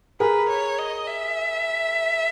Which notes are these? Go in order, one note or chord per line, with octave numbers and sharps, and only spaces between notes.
G#4 A#4 B4
C#5
D#5
E5